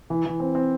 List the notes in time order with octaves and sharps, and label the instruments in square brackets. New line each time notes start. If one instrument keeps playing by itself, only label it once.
[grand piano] E3
E3
C4
C4